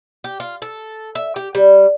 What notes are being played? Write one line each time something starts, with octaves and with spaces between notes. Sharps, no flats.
G4
F4
A4
E5
G4
G3